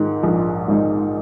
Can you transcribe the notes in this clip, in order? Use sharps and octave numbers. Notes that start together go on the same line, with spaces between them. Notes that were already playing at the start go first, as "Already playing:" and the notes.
Already playing: G#2 D#3 G#3 D#4
A#1
G#2 D#3 G#3 D#4